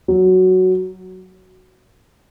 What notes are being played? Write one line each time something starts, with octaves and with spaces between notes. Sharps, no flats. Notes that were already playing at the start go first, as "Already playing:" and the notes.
F#3